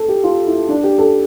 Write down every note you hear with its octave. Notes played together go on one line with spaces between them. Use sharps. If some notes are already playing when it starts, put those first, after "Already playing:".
Already playing: A4
G4
F4
E4
D4
G4
A4